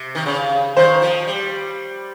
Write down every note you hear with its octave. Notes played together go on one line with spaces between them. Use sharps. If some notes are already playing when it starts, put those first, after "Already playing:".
Already playing: C3
D#3
C#3
D#3 C5
F3
G3